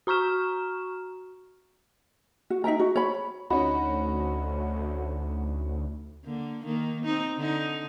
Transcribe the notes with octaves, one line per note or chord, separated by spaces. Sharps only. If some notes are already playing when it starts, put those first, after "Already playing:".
F#4 A#5 C#6 F6 E7
F#4
D#4 E5 G5 A#5
F#4
C#5 B5
D2 C#4 D#4 F#4 B5
D3 A#3
D#3 A#3
C4 D#4
D3 D#4